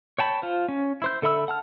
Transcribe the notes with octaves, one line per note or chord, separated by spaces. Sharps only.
C#5 G5 A5 B5
F4 C5
C#4
E4 C5 G6
D3 A4 E5 B5 E6
F#5 A5 F6